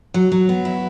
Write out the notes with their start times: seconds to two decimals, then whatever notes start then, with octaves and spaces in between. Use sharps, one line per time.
0.14 F#3
0.32 F#3
0.49 B3
0.65 E4